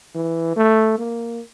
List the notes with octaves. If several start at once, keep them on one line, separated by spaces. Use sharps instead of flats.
E3
A3
A#3